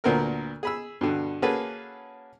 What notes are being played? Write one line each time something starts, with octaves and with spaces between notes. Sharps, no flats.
D2 A#2 B3 C4 A#4 F6
G#4 B5 E6
G2 B2 D3
A#3 C#4 F#4 G#4 A4 B4